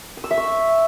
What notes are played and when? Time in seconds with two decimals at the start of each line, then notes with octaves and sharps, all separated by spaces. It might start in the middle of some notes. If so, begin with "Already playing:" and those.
0.17 D#6
0.24 E6
0.31 E5
0.38 C#6